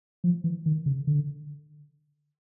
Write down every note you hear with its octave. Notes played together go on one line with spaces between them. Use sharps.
F3
E3
D#3
C#3
D3